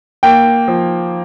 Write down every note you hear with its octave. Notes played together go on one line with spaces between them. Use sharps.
A#3 G5
F3